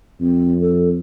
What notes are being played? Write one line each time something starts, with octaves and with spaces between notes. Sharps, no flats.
F2 C4
A4